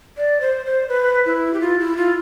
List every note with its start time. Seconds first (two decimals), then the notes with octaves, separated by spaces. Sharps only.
0.17 D5
0.41 C5
0.66 C5
0.89 B4
1.26 E4
1.53 G4
1.61 F4
1.80 E4
1.97 F4